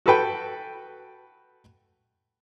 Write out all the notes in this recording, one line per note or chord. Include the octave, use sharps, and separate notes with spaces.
F#4 A4 B4 G5